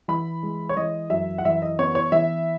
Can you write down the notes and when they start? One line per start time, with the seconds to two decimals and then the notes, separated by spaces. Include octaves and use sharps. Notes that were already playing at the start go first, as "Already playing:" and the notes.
0.08 E3 B5
0.43 G#3
0.69 C#5
0.77 E3 D#5
1.10 F#2 E5
1.38 F#5
1.45 E3 E5
1.62 D#5
1.79 B3 C#5
1.95 C#5
2.12 E3 E5